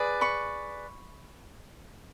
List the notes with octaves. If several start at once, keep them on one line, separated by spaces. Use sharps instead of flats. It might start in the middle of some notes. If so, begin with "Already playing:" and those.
Already playing: G#4 B4 D5
B5 C#6